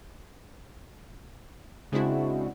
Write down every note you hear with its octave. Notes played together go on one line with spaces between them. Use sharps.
C#3 G#3 C4 D4 E4 F#4